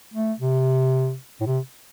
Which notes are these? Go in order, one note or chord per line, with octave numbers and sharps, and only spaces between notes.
A3
C3
A2
C3